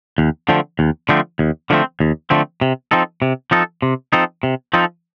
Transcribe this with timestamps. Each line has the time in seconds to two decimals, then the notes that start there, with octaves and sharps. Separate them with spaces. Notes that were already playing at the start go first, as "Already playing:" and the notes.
0.18 D#2
0.49 D3 F3 A3 C4
0.79 D#2
1.09 D3 F3 A3 C4
1.39 D#2
1.70 D3 F3 A3 C4
2.00 D#2
2.30 D3 F3 A3 C4
2.61 C3
2.91 F3 C4 D#4 A4
3.22 C3
3.51 F3 C4 D#4 A4
3.82 C3
4.13 F3 C4 D#4 A4
4.43 C3
4.74 F3 C4 D#4 A4